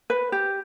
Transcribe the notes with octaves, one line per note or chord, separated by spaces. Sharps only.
B4
G4